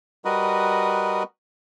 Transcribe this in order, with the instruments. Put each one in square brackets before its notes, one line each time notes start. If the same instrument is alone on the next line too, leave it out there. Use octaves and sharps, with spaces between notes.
[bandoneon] G3 F#4 A#4 B4 D#5